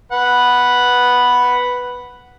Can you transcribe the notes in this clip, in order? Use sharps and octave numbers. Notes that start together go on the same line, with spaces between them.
B4 F#5